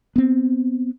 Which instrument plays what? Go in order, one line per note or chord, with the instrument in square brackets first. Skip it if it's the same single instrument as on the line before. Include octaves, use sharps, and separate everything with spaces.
[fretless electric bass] B3 C4